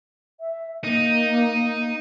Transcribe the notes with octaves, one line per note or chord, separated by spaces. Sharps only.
E5
A#3 D#4